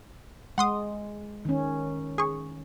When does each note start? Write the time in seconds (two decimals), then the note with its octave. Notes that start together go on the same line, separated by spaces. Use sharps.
0.58 G#3 F#5 C6 D#6
1.45 D#3 C#4
2.18 G#4 C#6